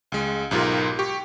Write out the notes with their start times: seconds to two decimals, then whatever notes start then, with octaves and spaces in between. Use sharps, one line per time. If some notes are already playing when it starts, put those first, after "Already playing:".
0.12 C#2 G#3
0.51 B1 G#2 F4 G4 A#4
0.99 G4 C#6